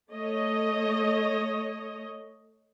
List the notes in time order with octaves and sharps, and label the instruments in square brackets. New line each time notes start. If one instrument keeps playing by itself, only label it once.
[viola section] A3 C#5 D#5